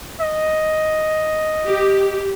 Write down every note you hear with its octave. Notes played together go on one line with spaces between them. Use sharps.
D#5
G4